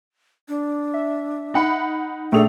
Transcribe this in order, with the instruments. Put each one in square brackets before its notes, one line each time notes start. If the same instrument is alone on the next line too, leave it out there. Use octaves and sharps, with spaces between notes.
[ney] D4
[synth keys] E5
[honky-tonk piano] D#4 F#5 B5
[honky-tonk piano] A#1 F7 [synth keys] A3 G#4 A4 [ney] D4